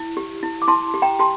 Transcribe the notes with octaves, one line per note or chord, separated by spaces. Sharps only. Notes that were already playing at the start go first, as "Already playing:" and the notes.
Already playing: E4
G4
E4
D6
E4 A5 C6
G4
G5 A#5
G4 A5 C6